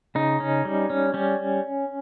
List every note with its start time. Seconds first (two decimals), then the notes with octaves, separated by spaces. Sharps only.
0.15 C#3 D#4
0.40 C#4
0.65 G3
0.90 C#4
1.14 G3 C#4